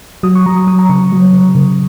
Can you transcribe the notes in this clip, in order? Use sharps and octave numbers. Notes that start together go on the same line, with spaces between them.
F#3 D#6
C#6
F#3 A#5
D#6
F#3 D#6
A#5
C#3 C#6
F#3
C#3
C#3